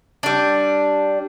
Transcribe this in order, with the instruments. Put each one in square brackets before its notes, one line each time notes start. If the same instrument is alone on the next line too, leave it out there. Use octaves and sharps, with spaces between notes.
[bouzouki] G3 D4